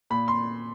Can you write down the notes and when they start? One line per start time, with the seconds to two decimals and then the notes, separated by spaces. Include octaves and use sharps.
0.10 A#2 B5
0.28 C6